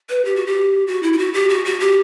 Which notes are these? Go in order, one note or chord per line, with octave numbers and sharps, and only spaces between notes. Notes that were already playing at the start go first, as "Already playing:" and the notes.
B4
G4
F#4
G4
F#4
E4
E4
F#4
G4
F#4
F#4
G4